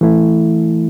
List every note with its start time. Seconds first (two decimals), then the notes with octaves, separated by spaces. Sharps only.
0.01 E3 A3 E4